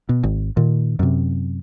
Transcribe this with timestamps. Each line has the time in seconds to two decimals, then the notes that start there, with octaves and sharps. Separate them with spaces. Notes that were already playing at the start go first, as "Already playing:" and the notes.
0.09 B2
0.24 G#1
0.57 A#2 D#3
0.99 F#2 C3